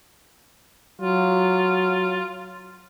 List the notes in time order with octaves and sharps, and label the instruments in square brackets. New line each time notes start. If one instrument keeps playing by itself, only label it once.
[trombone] F#3 [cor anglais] F4